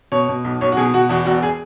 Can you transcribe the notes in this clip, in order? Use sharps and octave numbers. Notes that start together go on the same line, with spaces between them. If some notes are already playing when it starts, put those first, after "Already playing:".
B2 C#5
B2
B1
B1 C#5
F#4
B2 G#4
B2 F#4
E2 F#4
E1 F#4
G#4